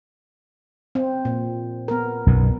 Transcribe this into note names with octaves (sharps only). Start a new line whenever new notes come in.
C4
A#2
B3 A#4
B1 F#2 B2